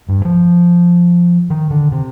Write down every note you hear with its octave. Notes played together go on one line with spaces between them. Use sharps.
G2
F3
D#3
D3
C3